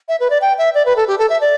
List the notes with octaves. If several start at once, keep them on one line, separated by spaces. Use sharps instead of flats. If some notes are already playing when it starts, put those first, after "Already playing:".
E5
B4
D5
G5
E5
D5
B4
A4
G4
A4
E5
D5